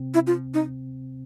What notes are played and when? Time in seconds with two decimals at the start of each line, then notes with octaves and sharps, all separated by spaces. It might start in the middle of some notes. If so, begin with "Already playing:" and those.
Already playing: C3 C4
0.14 E4
0.27 F4
0.54 D#4